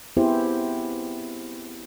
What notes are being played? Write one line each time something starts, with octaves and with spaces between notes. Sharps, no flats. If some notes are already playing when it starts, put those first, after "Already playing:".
B3 C4 E4 G4 G#4 C5